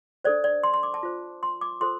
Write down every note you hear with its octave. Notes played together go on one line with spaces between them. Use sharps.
D4 A4 C5 D5
D5
C6
C6
D6
A5
F4 C5
C6
D6
F4 A4 C5 C6